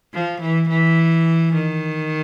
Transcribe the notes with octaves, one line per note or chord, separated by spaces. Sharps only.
F3
E3
E3
D#3